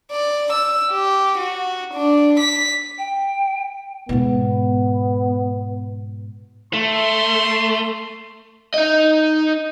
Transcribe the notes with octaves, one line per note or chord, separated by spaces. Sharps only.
D5
E6
G4
F#4
D4
B6
G5
G#2 B2 B3
A3 C6
D#4 D#5